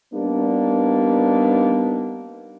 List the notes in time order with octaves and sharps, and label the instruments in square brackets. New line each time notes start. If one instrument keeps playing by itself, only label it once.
[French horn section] G3 A#3 B3 D4 D#4